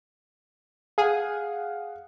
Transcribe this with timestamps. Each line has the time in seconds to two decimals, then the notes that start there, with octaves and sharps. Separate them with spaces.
0.98 G#4 F5 F#5